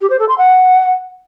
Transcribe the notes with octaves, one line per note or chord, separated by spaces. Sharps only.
G4
C5
A4
C6
F#5